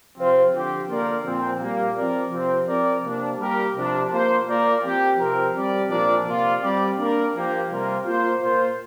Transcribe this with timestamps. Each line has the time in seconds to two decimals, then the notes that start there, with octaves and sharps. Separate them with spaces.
0.16 C3 F3 C4 F4 C5
0.52 D3 F3 C4 G4
0.88 D3 A#3 F4 A#4 D5
1.23 A#2 F3 C4
1.60 A#2 G3 A#3
1.96 F3 C4 A#4 D5
2.31 C3 F3 C4
2.67 F3 C4 A#4 D5
3.04 C3 A#3 D4
3.38 G3 A#3 G4 A#4
3.75 C3 F3 D4
4.11 A#3 F4 C5
4.47 A#3 F4 A#4 D5
4.83 F3 C4 G4
5.18 C3 F3 C4 A#4
5.53 G3 C4 G4 D5
5.90 A#2 F3 D4 A#4 D5
6.26 C3 A#3 F4 D5
6.62 G3 C4 G4 D5
6.98 A#3 D4 A#4 D5
7.34 F3 A#3 G4
7.70 C3 G3 A#3 F4 A#4
8.05 A#3 F4 C5
8.40 A#2 A#3 F4 C5